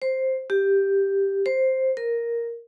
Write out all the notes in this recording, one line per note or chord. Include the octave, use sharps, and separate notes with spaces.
C5
G4
C5
A#4